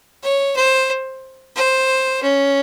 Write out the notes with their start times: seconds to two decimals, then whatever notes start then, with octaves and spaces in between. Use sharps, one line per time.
0.23 C#5
0.56 C5
1.56 C5
2.22 C#4